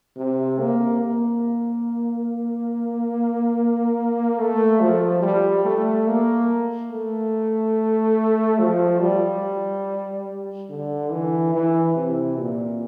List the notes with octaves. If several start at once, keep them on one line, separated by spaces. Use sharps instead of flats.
C3
A#3
A#3
A3
F3
G3
A3
A#3
A3
F3
G3
D3
E3
E3
C3
A#2